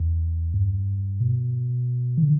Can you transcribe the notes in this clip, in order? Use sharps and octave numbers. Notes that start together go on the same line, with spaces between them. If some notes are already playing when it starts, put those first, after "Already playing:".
Already playing: E2
G2
B2
E3
D3